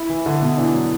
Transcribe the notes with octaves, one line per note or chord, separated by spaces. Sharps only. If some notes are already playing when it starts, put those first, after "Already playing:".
Already playing: E4
E3
D3
B2
E3 D4
F#3